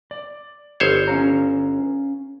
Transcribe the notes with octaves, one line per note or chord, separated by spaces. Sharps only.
D5
G1 C5 C#5
C#4 F5 A#5